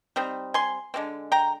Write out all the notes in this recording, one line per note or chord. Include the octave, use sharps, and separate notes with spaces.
G3 C4 D#4
G#5 C6
D3 G#3 C4
G5 A#5